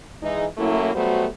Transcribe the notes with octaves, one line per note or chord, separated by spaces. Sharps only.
E3 G#3 D#4
F#3 A3 A#3 C#4 E4
F#3 G3 A3 B3 F#4 C5